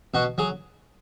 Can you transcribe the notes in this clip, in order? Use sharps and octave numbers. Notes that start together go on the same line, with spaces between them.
B2 F#4
F#3 G#4